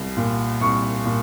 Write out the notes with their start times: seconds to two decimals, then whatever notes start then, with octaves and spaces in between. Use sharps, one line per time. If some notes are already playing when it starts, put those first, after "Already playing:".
Already playing: C2
0.17 A#2
0.61 C2 C#6
1.06 A#2